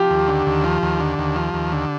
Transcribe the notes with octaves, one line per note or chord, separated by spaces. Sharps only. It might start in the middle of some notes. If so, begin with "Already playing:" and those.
Already playing: F3 G4
D#2
D3
D#2
F3
D#2
D3
D#2
F3
D#2
D3